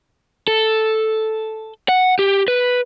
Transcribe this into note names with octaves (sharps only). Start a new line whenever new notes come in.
A4
F#5
G4
B4